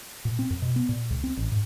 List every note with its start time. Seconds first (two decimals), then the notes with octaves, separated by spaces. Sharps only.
0.25 A#2
0.39 C4
0.50 F#2
0.62 B2
0.76 B3
0.89 A#2
1.10 C#2
1.24 C4
1.37 A1
1.52 G#2